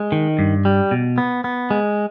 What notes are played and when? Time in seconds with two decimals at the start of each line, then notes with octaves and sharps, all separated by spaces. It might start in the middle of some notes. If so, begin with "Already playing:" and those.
Already playing: G#3
0.12 D#3
0.39 G2
0.65 G3
0.91 B2
1.18 B3
1.44 B3
1.70 G#3